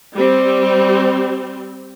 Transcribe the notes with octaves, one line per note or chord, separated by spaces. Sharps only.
G3 C4